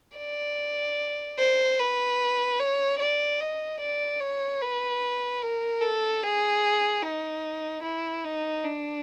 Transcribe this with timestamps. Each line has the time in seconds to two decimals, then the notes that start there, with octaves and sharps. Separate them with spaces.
0.17 D5
1.38 C5
1.79 B4
2.60 C#5
2.99 D5
3.40 D#5
3.81 D5
4.20 C#5
4.61 B4
5.42 A#4
5.81 A4
6.22 G#4
7.02 D#4
7.83 E4
8.24 D#4
8.64 D4